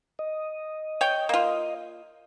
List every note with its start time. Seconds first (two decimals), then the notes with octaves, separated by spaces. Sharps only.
0.19 D#5
1.01 C#5 G5
1.29 A#3 F4